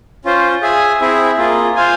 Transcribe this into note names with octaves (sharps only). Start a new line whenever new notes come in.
C#4 F4 C5
G#4 E5 G#5
C4 E4 G#4 E5
A#3 F4 G#4
F4 C5 F5 G#5